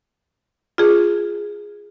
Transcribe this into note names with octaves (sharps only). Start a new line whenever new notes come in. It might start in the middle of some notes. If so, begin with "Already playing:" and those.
F4 G#4